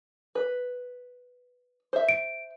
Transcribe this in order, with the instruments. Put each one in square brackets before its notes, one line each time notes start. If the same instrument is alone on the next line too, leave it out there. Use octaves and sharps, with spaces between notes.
[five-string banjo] B4
C5 E5
[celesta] D7